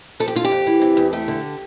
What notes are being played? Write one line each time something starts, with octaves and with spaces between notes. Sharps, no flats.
F3 A4
G4
D3 F4
G4
F2
E3
C3
E2
A3 G4
D3